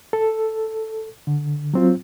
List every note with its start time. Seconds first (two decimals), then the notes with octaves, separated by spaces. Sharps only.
0.13 A4
1.27 D3
1.74 F#3 C4 F4